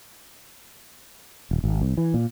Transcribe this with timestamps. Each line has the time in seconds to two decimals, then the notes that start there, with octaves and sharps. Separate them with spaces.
1.51 D#1
1.64 G#1
1.81 C2
1.97 E3
2.14 A#2